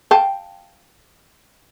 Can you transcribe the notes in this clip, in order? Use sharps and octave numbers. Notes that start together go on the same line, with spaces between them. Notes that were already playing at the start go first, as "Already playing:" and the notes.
F5 G5 A5